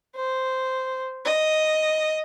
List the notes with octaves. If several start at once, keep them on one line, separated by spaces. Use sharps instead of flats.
C5
D#5